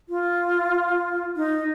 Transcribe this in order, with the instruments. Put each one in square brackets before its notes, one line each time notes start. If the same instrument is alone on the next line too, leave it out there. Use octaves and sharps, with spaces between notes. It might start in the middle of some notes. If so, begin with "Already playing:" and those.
[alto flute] F4
D#4